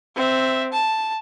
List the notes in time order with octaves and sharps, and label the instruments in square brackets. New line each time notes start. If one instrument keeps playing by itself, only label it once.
[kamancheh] C4 E5
A5